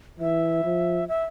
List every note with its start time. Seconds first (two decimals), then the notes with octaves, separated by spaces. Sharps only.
0.19 E3 E5
0.65 F3
1.09 E5